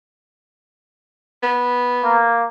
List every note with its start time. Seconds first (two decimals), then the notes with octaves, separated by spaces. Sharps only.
1.43 B3
2.03 A#3